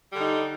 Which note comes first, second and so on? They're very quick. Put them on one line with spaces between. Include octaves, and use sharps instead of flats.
G3 D3 D#4